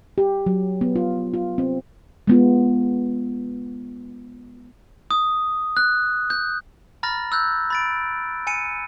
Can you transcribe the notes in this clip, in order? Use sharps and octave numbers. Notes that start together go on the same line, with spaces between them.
G4
F#3
B3
F4
F4
C4
G#3 B3 F4
D#6
F#6
G6
A#5 B5 F6 A6 A#6
E6 F#6 G6
B5 A6 D7
G#5 C#7 D#7